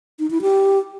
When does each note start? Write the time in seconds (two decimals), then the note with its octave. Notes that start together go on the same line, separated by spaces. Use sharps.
0.19 D#4
0.31 E4
0.42 G4